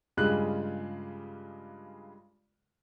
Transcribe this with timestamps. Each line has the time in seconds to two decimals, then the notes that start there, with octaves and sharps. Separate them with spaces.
0.17 G2 C#3 G#3 F4 G4 F#6